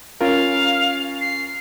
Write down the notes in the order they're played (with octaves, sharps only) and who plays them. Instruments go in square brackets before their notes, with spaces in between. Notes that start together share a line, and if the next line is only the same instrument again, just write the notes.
[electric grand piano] C#4 F4 A#4 [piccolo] F5
[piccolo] C7